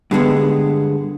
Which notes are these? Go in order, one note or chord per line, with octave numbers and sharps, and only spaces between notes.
G2 D3 G#3 B3